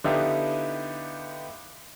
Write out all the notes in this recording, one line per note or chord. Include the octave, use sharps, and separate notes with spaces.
D3 B3 D#4 E4 G4 F5